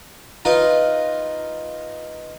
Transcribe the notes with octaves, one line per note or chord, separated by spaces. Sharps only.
D#4 F4 A#4 B4